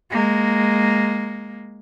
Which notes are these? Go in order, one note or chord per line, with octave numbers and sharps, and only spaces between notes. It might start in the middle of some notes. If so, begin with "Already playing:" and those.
G#3 A#3